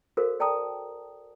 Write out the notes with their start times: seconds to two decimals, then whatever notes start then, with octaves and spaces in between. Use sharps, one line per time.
0.17 F#4 A4 A#4 C5 F5
0.40 D5 G5 A5 A#5 D#6